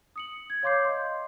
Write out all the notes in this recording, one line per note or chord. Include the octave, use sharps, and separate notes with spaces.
D#6 C#7 F#7
G#6
C#5 F5 C6 D6 G6 C7
D#5 C6